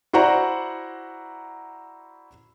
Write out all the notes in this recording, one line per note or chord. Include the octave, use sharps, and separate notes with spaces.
E4 F#4 C5 D5 F#5 A#5